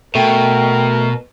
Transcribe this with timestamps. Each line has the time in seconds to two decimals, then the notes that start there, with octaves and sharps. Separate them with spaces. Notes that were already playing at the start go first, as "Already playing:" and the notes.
0.15 B2 A3 A#4 G5